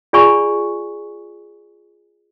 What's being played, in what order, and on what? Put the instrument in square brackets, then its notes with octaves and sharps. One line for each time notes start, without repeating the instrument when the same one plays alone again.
[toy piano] F4 G#4 D5 G#5 B5 C#6